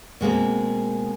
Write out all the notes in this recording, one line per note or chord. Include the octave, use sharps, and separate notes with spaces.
B2 G#3 A#3 C4